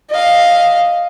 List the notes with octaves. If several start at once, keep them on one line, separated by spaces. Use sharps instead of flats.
D#5 F5